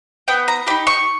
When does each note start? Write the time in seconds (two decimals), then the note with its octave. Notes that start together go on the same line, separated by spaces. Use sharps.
0.28 B3 G5
0.48 A#5
0.67 G4 B5
0.70 D#4
0.87 C#6